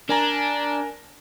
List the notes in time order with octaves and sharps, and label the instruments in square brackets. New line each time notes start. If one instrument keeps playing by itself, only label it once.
[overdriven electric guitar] D4 [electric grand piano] A#4 G#5 A#5